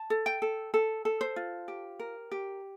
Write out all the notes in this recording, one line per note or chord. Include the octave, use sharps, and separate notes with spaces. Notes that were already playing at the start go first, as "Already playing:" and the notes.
Already playing: A5
A4
G5
A4
A4
A4
C5
F4
G4
A#4
G4